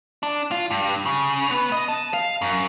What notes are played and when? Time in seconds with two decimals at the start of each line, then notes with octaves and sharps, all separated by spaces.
0.23 D4
0.52 F4
0.71 G2
1.06 C#3
1.51 B3
1.72 D#5
1.88 A5
2.13 F5
2.42 F#2